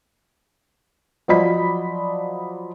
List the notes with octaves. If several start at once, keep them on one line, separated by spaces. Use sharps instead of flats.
F3 F#3 D5 D#5 B5 B6